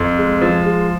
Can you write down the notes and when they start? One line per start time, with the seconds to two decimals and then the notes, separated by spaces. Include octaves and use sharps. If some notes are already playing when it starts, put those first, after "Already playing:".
Already playing: F2
0.18 G#3
0.41 F3
0.65 G#3